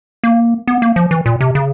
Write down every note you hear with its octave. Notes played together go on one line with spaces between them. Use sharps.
A#3
B3
A#3
F3
E3
A#2
C3
C#3